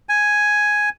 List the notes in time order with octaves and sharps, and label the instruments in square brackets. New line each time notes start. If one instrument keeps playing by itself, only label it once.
[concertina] G#5